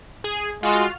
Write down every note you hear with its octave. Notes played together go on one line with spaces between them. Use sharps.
G#4
G#3 F4 F#4 F6